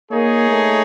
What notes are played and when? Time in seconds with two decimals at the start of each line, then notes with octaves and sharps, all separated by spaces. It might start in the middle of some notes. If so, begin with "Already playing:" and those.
0.11 A#3 D#4 G#4 C#5
0.51 A3